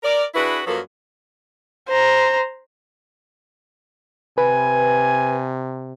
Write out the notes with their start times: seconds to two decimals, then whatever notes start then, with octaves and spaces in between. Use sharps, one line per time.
0.03 A#4 D5
0.35 D4 E4 F#4 G#4 B4
0.67 F#2 F3 F#3 A#3 A4 B4
1.89 C5 A#5
4.38 C3 B4 G#5